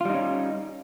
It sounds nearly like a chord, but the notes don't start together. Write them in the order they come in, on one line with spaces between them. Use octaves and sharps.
F4 G3 D#4 C#4